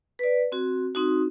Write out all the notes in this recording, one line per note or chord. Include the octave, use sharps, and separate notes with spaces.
B4 D5
C4 F#4
C4 D#4 F#4